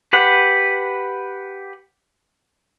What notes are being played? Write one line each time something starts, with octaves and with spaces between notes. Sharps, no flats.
G4 B4 F#5